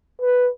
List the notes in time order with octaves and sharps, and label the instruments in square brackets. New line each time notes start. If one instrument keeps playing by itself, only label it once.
[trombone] B4